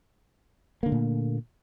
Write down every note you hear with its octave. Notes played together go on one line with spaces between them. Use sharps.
A#2 D3 A3 A#3